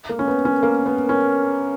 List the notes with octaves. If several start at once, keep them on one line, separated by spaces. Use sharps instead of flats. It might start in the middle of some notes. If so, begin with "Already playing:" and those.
A#3
C#4
B3
C#4
A#3
B3
C#4